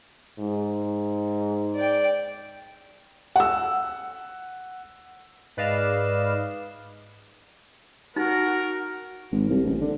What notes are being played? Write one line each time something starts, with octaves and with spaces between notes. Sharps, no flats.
G#2
D5 G5
F#5 E6
G#2 B4 D5 D#5 F5 E7
D#4 F#4 A#4
G#1
C2
A1
D3